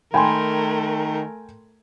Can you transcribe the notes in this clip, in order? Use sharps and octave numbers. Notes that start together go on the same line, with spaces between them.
D#3 A3 A#4 G5 G#5 B5 C6